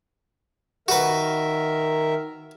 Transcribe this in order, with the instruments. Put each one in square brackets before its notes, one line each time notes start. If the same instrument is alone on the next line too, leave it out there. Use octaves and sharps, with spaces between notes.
[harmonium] D#3 A#4 E5 [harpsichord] F#4 B4